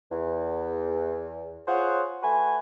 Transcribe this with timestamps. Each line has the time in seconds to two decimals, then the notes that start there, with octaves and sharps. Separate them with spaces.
0.11 E2
1.68 F4 G#4 C5 C#5 F#5
2.22 A3 F#4 B4 G#5